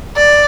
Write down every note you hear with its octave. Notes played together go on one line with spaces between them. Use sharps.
D5